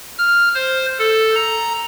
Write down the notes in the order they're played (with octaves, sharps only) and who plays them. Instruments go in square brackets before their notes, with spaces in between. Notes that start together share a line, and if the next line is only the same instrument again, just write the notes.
[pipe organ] F6
C5
A4
A#5